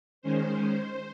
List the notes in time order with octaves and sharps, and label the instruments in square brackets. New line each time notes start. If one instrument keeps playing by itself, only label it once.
[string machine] D#3 G#3 C#4 C5